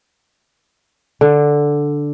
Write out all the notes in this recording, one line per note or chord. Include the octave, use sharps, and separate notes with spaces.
D3